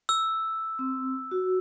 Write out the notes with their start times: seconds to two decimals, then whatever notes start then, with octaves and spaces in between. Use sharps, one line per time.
0.09 E6
0.79 C4
1.31 F#4